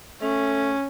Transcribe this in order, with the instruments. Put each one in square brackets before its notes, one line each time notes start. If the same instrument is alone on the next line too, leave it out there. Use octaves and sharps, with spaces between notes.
[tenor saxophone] A3 [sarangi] C#4